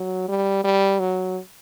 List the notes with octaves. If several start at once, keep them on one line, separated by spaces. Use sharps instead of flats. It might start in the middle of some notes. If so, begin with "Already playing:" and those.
Already playing: F#3
G3
G3
F#3